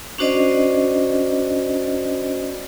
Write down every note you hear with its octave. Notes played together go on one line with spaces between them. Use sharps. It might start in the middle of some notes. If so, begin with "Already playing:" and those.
C#4 D4 F#4 C5 D5 D#5